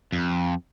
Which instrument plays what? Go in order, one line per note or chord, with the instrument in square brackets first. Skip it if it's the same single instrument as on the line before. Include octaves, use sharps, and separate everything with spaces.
[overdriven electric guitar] F2